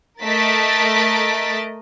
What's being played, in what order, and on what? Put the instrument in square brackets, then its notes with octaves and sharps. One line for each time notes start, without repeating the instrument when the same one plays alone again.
[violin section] A3 A#4 D#5 A6 B6 D7